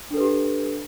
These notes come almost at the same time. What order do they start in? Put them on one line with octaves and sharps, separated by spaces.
D4 A4 B4 G4